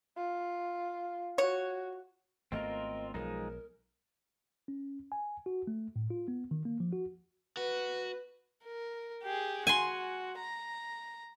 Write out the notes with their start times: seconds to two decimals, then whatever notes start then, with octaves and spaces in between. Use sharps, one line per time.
0.16 F4
1.38 F#4 C#5
2.52 G#1 A3 B3 C4 F4 A#4 D#5
3.14 B1 F3 G#3 D#4 A#4
4.68 C#4
5.12 G#5
5.46 F#4
5.67 A3
5.96 A2
6.10 F4
6.28 B3
6.51 D#3
6.65 A#3
6.80 F3
6.93 F#4
7.57 F#4 B4
8.64 A#4
9.23 G4 G#4
9.67 F#4 G#5 C6
10.39 A#5